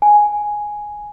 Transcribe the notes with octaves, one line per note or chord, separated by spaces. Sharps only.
G#5